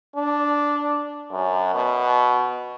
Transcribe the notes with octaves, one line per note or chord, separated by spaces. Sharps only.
D4
F#2
B2